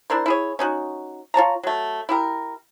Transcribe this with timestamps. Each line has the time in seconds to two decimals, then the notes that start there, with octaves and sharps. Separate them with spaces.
0.10 D4 E4 A#4 C5
0.26 E4 G#4 C#5
0.59 C#4 D#4 F#4
1.34 F4 C#5 A5 A#5
1.63 F#3 A3
2.09 E4 G4 A#4